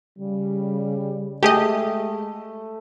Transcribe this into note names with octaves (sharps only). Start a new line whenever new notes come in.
C#3 G3
G#3 A3 G4 G#4 D#5